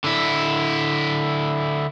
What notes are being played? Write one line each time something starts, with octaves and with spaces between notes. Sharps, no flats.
D3 E4